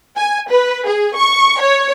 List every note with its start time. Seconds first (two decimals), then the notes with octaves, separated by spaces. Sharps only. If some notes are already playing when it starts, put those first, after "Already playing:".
0.17 G#5
0.50 B4
0.86 G#4
1.16 C#6
1.60 C#5